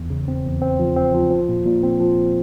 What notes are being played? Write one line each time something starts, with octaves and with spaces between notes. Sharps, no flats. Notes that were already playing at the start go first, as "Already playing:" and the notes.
Already playing: E2
C#3
C4
E2
C4
F3
C4
F3
F3
A#2
A#2
C4
F3
A#2